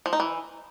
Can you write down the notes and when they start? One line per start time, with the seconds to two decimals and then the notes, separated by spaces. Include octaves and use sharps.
0.06 F3
0.13 D#4
0.20 E3